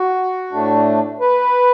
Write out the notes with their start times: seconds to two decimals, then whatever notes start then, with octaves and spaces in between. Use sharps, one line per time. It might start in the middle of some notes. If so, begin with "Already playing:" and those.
Already playing: F#4
0.52 A2 A3 D4
1.20 B4